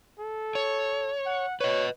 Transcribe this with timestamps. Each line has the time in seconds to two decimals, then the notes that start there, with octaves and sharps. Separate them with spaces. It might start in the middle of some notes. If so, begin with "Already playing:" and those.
0.19 A4
0.55 C#5
1.26 F#5
1.60 B4 C#5 D#5